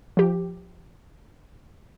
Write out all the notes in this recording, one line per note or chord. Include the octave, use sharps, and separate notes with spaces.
F3 G4